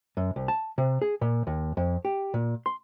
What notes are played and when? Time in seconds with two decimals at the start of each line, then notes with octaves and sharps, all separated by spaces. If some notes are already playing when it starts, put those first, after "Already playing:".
0.17 F#2
0.36 C2
0.48 A5
0.78 C3
1.02 G#4
1.21 A#2
1.47 D#2
1.77 F2
2.05 G4
2.34 A#2
2.66 C6